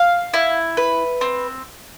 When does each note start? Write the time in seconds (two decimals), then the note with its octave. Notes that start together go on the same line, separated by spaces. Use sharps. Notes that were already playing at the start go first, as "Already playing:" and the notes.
Already playing: F5
0.34 E4
0.77 B4
1.21 C4